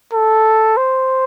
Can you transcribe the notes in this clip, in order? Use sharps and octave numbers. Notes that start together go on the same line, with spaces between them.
A4
C5